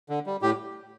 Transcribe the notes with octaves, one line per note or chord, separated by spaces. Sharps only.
D3
G3
A2 G4